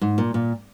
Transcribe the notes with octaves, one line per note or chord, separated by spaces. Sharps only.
G#2
A#2
A#2